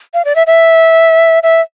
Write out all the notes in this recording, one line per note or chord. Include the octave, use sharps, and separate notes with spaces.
F5
D5
E5
E5
E5